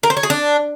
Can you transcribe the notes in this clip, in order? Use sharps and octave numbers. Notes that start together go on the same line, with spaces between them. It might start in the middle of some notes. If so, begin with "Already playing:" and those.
A#4
C5
C#5
G#4
D4